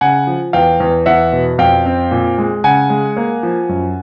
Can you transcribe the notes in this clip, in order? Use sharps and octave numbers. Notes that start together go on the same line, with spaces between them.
C#3 F#5 G#5
F3
E2 F5 G5
E2
E2 E5 F#5
B2
F2 F5 G5
C4
A#2
G#3
C#3 F#5 G#5
G#3
A#3
F3
F#2